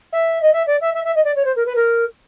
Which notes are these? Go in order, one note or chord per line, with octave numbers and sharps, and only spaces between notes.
E5
D#5
E5
D5
E5
E5
E5
D#5
D5
C#5
C5
A#4
B4
A#4